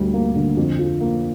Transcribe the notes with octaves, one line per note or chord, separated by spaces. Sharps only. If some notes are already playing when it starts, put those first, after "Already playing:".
Already playing: D2 G3
A#3
D3
F2
F3
A#3